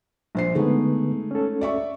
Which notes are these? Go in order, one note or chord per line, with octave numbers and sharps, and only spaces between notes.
A#1 C5 C7
D3 G#3 A3 B3 D#4
C#4 A4
D5 E5 C#6